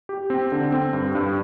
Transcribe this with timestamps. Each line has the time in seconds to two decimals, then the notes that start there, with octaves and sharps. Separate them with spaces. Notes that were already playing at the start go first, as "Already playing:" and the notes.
0.09 G4
0.30 C4
0.52 D3
0.72 C4
0.93 G2
1.15 G2